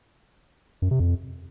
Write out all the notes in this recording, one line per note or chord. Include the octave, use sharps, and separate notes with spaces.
F#2
C3
F2